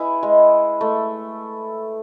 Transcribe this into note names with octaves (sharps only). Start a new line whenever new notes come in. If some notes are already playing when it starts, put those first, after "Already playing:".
Already playing: E4 G#4 B4
G#3
A3